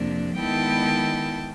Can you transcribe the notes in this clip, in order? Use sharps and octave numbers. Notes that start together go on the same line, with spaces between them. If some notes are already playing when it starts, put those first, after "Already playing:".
Already playing: F2 C3 F3 A#3 D4
D#3 G#3 B3 E4 G5 A5